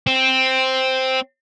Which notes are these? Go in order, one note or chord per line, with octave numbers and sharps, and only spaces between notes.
C4